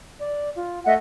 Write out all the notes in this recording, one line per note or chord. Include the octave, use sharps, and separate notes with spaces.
D5
F4
A3 D#5 E5 F#5